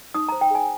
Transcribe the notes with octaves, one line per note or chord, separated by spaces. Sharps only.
D#4 D#6
A#5
C5
G5
G#4 G#5